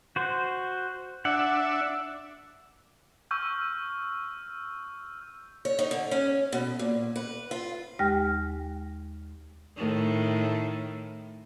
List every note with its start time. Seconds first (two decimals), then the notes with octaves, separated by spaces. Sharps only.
0.16 F#4 C5
1.25 D4 E5 F#5
3.31 C#6 E6 F6 G6
5.65 C#5
5.79 D#4
5.91 D3
6.11 C#4
6.52 B2
6.79 A#2
7.16 B4
7.51 F4
7.99 D#2 G#3 G4 G5 F6 A#6
9.75 A2 D#3 A3